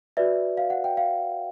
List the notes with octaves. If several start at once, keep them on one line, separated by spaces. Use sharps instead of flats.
F#4 B4 D5 E5
F5
F#5
G5
F5